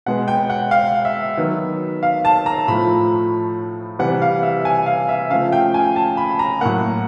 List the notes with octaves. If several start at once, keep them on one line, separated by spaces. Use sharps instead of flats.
B2 G#3 B3 F#5
G5
F#5
F5
E5
D#3 F#3 B3
F5
A5
A#5
A2 F3 A3 B5
C3 E3 G3 F#5
F5
E5
G#5
F5
E5
C#3 F3 A3 F5
G5
G#5
A5
B5
A#5
A2 F#3 A#3 F#5